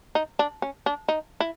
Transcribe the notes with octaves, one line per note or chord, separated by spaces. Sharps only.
D#4
D4
C#4
D4
D#4
E4